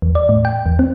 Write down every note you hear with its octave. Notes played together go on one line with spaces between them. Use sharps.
E2
D5
A2
G5
E2
C4